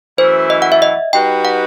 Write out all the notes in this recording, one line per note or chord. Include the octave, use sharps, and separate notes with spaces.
F#2 E3 A3 E4 C5
D#5
F#5
E5
D#5
G3 D#4 F#4 B4 G5
F#5